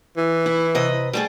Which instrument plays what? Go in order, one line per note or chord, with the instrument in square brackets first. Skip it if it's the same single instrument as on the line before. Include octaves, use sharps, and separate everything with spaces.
[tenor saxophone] E3
[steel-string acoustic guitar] E4
C3 B4 D#5
G3 A3 G#4